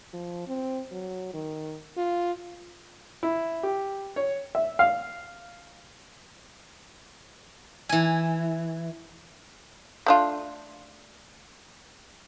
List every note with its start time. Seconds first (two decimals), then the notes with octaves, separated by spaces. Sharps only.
0.13 F3
0.48 C4
0.91 F#3
1.34 D#3
1.97 F4
3.23 E4
3.63 G4
4.16 C#5
4.55 E5
4.79 F5
7.89 E3 G#5
10.06 A3 D4 F4